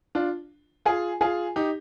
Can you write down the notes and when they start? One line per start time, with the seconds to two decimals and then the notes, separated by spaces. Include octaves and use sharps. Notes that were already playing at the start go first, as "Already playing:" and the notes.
0.15 D4 F4
0.85 F4 G#4
1.21 F4 G#4
1.56 D#4 G4